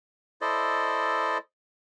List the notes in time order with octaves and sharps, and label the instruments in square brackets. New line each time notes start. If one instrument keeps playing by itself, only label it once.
[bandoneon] E4 A4 C5 D5 D#5